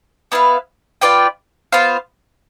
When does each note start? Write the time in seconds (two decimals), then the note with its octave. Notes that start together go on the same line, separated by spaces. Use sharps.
0.32 B3 E4 B4 F5
1.02 F4 B4 D5 G5
1.72 B3 F4 C5 F5